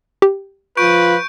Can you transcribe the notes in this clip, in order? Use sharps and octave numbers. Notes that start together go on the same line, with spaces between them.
G4
F3 F4 B4 C#6 G6 D7